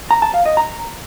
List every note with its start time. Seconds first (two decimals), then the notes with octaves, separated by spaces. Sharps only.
0.11 A#5
0.22 A5
0.34 F5
0.45 D#5
0.57 A#5